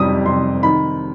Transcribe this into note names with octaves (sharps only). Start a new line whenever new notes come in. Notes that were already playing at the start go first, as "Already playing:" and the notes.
Already playing: F2 C3 G3 D#6
C3 C6
D#3 B5